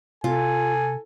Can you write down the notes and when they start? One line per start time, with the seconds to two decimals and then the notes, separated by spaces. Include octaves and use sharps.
0.24 C3 F4 A4 G#5